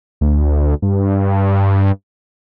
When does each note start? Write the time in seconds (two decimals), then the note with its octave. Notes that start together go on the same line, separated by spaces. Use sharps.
0.21 D2
0.82 G2